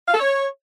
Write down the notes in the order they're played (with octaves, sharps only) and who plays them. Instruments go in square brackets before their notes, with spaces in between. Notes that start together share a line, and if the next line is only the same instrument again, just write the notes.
[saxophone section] F5
A4
C#5